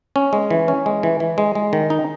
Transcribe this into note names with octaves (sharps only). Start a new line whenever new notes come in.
C#4
G#3
E3
C#4
G#3
E3
E3
G#3
G#3
D#3
D#4